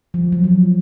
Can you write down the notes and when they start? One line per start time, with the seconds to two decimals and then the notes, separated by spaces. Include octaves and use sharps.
0.14 F3
0.32 F#3
0.44 F3